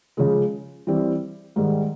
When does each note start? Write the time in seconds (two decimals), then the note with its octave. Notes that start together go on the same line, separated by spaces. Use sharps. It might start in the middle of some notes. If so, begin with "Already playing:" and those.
0.17 C#3 F3 G#3
0.87 E3 G3 C4
1.56 G#2 D#3 G3